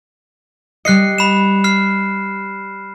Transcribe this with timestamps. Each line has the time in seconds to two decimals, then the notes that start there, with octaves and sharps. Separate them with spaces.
0.85 G3 D#5 F#6 C7 C#7
1.18 B5 E7
1.64 F6 C7